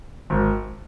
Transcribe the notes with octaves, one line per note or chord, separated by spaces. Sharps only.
G#1